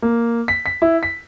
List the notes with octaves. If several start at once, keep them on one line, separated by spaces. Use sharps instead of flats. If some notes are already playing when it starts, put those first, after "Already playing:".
A#3
B6
B6
E4
B6